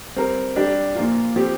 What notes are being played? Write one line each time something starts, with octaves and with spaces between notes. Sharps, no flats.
G3 C4 A#4
G3 D4 G4
A#2 F3 A#3 F4
F3 C4 G4